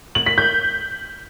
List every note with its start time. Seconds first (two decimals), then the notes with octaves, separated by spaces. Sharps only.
0.15 F#7
0.26 B6
0.38 G6